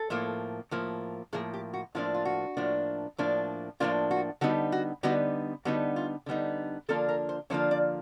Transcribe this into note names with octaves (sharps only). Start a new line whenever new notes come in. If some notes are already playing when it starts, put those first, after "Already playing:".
Already playing: A4
A2 F3 A#3
A2 F3 A#3
A2 F3 A#3 G#4
G4
F#4
A2 F3 A#3 D4 F4
F4
F#4
A2 F3 A#3 D4
A2 F3 A#3 D4
A2 F3 A#3 D4 F4
F#4
D3 G3 B3 D#4 F#4
F#4
D3 G3 B3 D#4 F#4
D3 G3 B3 D#4 F#4
F4
D3 G3 B3 D#4
D3 F3 A#3 D4 F4 A4
A#4
C5
D3 F3 A#3 D4 F4 C#5
D5